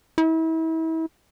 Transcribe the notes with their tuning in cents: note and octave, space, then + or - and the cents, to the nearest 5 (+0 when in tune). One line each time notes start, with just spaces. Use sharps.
E4 -35